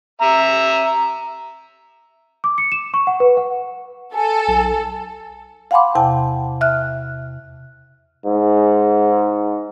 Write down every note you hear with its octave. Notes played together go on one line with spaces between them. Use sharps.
E5 A#5
D6
C#7
E7
C#6
F#5
B4
F#5
A4 G#5
B1
F5 F#5 G#5 B5 C6 D6
E2 C3 G5 A5
E5 F6 F#6
G#2